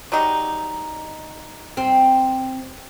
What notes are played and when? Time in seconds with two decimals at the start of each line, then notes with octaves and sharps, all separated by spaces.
0.12 F#3 G3 D#4
1.77 C4